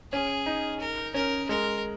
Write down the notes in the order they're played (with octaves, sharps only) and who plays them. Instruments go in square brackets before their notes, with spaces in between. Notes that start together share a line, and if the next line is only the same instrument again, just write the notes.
[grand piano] C#4 [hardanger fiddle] G#4
[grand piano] D#4
[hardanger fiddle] A#4
[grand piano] C#4 [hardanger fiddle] A#4
[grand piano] G#3 [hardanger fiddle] A#4